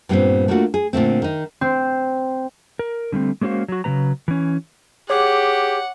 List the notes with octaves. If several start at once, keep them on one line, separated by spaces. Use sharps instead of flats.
G2 A#2 G3 G#3 B3 C4
A3 A#3 D4 F4 F#4
G#4
A#2 D3 A3 C4
D#3 D#4
C4
A#4
D3 G3 A3 C4
G#3 A#3 C#4 F#4 C5 F5
F#3 F#4
C#3 F#3 G3 B4 A#5
E3 C#4
G4 G#4 C#5 F#5 D6